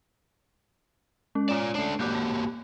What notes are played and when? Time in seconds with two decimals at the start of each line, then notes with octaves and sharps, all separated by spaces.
1.35 G#3 C#4
1.49 F4 C#5 D5 E7
1.75 A3 D4 C#5 C7
2.00 A#3 F#4 G4 D6 F#6 G6
2.15 A5